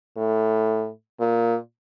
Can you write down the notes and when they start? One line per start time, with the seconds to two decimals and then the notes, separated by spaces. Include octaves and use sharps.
0.17 A2
1.20 A#2